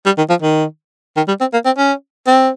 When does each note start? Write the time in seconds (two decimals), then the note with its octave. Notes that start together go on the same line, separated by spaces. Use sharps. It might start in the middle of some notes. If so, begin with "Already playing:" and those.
0.06 G3
0.18 D#3
0.30 F3
0.42 D#3
1.17 D#3
1.28 G3
1.41 C4
1.53 A#3
1.66 C4
1.78 C#4
2.27 C4